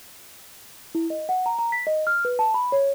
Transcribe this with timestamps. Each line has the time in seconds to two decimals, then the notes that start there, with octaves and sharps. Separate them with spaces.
0.95 E4
1.10 D#5
1.29 F#5
1.46 A#5
1.59 A#5
1.72 B6
1.87 D#5
2.07 F6
2.25 B4
2.39 A5
2.54 B5
2.72 C#5